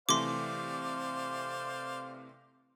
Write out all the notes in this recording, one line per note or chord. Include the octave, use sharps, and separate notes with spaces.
C3 E3 A3 C5 D5 F5 C6 D6